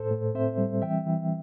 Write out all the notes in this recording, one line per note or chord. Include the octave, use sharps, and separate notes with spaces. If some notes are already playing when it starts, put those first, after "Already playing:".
Already playing: A2 A4 C5
A2
C4 C5 E5
G3
E3 E5 G5
E3